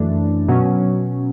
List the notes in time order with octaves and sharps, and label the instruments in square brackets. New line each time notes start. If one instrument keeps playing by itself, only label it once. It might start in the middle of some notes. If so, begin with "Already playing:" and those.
Already playing: [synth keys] F#2 E3 A3 D4
B2 F#3 C#4